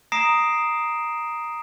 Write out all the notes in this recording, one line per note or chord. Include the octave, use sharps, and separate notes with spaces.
A#5 D#6 A#6 C7 D7 E7